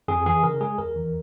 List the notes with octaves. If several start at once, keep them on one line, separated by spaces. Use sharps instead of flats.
F2 G#4
E3 G#4
C#3 A#4
G#3 G#4
E2 A#4
E3